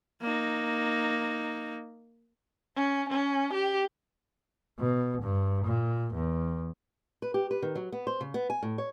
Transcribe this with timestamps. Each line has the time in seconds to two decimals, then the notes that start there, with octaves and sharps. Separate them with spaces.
0.22 A#3 D#4
2.76 C#4
3.10 C#4
3.53 G4
4.79 B2
5.22 G2
5.65 A#2
6.15 E2
7.22 B4
7.34 G4
7.51 B4
7.62 D#3
7.75 F#3
7.92 B3
8.07 C5
8.21 C#3
8.34 B3
8.50 G#5
8.63 A2
8.78 C#5